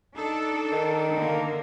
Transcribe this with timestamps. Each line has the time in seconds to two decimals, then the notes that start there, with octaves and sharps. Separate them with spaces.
0.15 D4 D#4 A4
0.71 D#3
1.13 D3 A#3